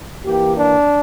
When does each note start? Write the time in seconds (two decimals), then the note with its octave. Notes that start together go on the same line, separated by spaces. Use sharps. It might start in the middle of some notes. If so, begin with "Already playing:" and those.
0.24 E3 A#3 G4
0.56 D4